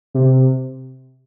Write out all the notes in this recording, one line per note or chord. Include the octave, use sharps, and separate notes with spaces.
C3